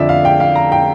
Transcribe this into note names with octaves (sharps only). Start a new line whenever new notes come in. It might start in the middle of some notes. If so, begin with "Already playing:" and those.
Already playing: F2 D3 F3 D5 E5
F5
G5
F5
A#5
G5